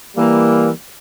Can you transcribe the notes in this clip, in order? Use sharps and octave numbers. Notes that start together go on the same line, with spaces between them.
E3 G3 A#3